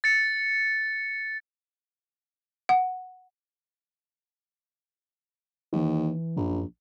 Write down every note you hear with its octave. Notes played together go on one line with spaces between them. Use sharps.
A6 C#7
F#5
D#2 E3
A#1 F#2